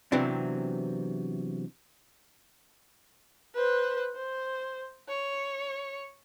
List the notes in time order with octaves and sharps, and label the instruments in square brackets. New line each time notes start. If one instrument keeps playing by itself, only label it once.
[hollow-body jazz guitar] C3 E3 F#3 B3 C4 D4
[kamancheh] B4 C5
C5
C#5